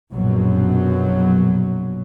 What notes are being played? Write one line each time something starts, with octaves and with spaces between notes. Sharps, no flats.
A#1 F#2 B2 F#3